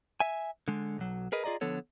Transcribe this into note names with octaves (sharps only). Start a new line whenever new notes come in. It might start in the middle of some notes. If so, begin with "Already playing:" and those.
E5 G#5
D3 G#3
B1 F#3
G#4 A#4 B4 D#5
F4 G#4 D5 D#5 A#5
D3 F3 B3 A4 C#5